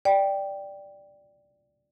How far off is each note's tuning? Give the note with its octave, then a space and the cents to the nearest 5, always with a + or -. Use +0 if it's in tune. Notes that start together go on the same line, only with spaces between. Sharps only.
D5 +0 G5 +0